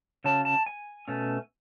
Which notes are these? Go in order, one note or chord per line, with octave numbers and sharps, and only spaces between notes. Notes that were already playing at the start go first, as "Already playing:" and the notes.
C#3 F#3 C#4 A5
A5
G#5
B2 A3 C#4